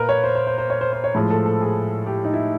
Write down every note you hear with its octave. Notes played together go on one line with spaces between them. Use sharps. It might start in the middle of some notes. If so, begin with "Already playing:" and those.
Already playing: A#2 A#4 B4
C#5
C5
C5
C5
C5
C#5
C5
C5
C#5
A2 F3 G#3
A4
A4
G#4
G4
D#4
E4